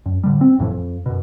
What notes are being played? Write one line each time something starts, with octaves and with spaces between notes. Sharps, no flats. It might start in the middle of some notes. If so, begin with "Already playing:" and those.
F#2
A2 D3 G3
C4
A#1 F2 A2 E3
F2
F#2 B2